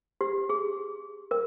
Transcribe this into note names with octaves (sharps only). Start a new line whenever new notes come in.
G4
G#4
A#4